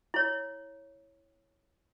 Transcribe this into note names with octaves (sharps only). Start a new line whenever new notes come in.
E4 C#5